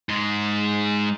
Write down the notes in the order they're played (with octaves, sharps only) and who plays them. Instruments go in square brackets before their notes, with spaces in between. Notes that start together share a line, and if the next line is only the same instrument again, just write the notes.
[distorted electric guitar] G#2 G#3